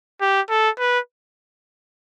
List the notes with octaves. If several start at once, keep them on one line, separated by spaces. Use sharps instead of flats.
G4
A4
B4